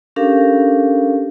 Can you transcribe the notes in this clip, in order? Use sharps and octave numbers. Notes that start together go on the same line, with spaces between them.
C#4 D4 G4 A4 A#4 F5